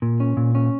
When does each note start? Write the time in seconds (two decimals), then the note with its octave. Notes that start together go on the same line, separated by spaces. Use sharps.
0.02 A#2
0.20 C#4
0.37 A#2
0.55 C#4